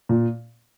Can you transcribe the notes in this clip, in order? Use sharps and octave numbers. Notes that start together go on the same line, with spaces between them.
A#2